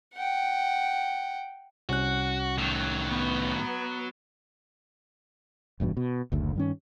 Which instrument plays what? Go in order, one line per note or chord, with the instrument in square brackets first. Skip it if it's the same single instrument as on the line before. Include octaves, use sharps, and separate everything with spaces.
[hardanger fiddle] F#5 G5
[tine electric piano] C2 C#4 F#6 [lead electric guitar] F#4
[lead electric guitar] A2 D#3 [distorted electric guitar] F#3
[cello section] B3
[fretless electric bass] D#1 E2 G2 B2
B2
F#1 D2 D3
G2 D#3 C#4